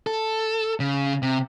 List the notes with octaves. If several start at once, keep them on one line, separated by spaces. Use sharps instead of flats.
A4
C#3
C3